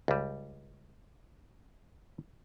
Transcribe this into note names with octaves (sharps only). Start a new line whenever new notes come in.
C#2 G3